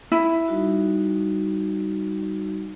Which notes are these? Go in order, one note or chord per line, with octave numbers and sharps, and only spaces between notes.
E4
G3 D#4 F#4